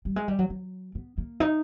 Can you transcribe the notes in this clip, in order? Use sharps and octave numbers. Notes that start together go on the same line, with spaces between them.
G3
G#3
G3
F#3
F#3
B3
A#3
D#4